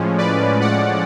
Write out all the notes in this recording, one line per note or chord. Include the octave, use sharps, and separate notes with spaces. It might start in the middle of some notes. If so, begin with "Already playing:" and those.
Already playing: A2 F3 G#3 C#4
B4 D5
D5 F#5